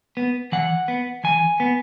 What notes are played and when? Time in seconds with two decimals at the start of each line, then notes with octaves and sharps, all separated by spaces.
0.17 B3
0.52 E3 F#5
0.88 B3
1.24 E3 G#5
1.60 B3